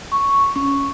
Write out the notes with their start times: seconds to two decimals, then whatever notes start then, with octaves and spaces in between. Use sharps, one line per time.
0.12 C#6
0.56 C#4